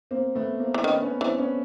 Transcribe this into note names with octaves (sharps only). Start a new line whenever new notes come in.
A#3 C4
A3 B3
A#3 C4
E3
D4
D#3 B3 C#4
B3 C#4
E3 C4 D4
B3 C#4